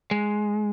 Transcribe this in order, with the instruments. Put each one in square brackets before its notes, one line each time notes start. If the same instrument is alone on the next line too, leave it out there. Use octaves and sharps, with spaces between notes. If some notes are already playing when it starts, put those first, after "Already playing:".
[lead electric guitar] G#3